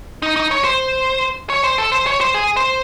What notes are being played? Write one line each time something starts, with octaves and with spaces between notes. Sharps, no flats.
D#4
D#4
C#5
C5
C#5
C5
A4
C5
C#5
C5
G#4
C5